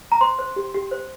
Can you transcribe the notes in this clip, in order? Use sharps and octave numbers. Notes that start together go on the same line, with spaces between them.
A#5
C5 C6
C5
G4
G4
C5